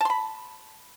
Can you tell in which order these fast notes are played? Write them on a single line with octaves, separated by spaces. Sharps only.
A5 C6 B5